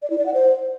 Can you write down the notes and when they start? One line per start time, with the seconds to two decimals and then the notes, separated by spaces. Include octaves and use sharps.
0.02 D5
0.10 E4
0.18 D5
0.26 F#5
0.34 C5